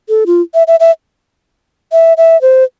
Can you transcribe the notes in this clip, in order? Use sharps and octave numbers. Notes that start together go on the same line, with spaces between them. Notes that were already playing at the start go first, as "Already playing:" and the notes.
A4
F4
E5
E5
E5
E5
E5
C5